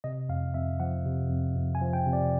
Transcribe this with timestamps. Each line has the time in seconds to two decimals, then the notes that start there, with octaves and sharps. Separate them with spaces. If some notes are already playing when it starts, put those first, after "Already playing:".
0.04 C3 D#5
0.29 F2 F5
0.54 F2 E5
0.80 F3 F#5
1.05 C3
1.30 F2
1.56 F2
1.75 G#5
1.81 F3
1.93 G5
2.06 C3
2.13 D5